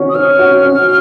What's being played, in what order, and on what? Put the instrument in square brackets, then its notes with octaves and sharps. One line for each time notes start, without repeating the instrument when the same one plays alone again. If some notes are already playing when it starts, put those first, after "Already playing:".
Already playing: [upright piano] D#3 C#4 F#4
[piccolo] D#6
[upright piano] C#4 [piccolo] F6
[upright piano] F#4
C#4